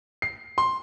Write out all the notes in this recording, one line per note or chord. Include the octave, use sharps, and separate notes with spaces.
C7
C6